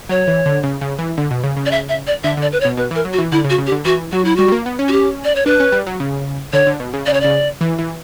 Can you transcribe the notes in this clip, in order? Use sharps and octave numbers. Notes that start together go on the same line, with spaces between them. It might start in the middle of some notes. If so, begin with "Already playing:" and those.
F#3 C#5
E3
D3
C#3
C#3
E3
D3
B2
C#3
C#3
D5
E5
E5
D5
D3 E5
D3
D5
B4
C#5
B2
B2 B4
E3
A#4
F#3
F#4
E3
D3 E4
C#3
F#4
C#3
G4
D3
E3 F#4
F#3 F#4
E4
G3 F#4
G3
A#3
B3
C#4
F#4
G4
D5
C#5
D4 B4
C#4
G3
F#3
C#3
D3 C#5
D3
B2
C#3
C#3 D5
C#5
C#3 D5
E3
E3